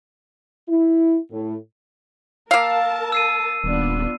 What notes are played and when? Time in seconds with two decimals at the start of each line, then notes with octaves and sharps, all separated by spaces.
0.69 E4
1.31 A2
2.51 A#3 A#4 F5 A5 E6
3.12 E6 C7 D#7
3.64 D#1 B3 D4 F4